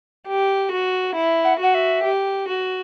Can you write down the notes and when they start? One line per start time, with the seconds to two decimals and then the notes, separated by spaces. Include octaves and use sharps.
0.27 G4
0.71 F#4
1.16 E4
1.45 F#5
1.59 F#4 F#5
1.74 E5
2.04 G4
2.47 F#4